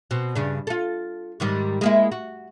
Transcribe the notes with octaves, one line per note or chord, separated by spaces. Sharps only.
B2 C4
G2 C#3 D4
F4 A4
G#2 D#3 G3
G#3 A#3 E4
F#4